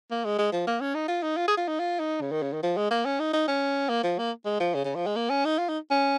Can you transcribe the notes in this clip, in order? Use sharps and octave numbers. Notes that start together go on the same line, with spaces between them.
A#3
G#3
G#3
F3
A#3
C#4
D#4
F4
D#4
F4
G#4
F4
D#4
F4
D#4
C#3
D#3
C#3
D#3
F3
G#3
A#3
C#4
D#4
D#4
C#4
A#3
F3
A#3
G#3
F3
C#3
C#3
F3
G#3
A#3
C#4
D#4
F4
D#4
C#4